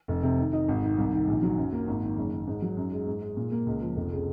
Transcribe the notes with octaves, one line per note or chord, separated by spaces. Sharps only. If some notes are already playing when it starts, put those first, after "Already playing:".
F1
C3
D#3
D#4
G#1
D#3
C2
D#3
A#1
F#3
F#2
A#3
G#1
D#3
F#1
D#3
G#2
F#3
F#2
G#3
G#2
G#3
A#2
A#3
C#2
F3
F1
C#3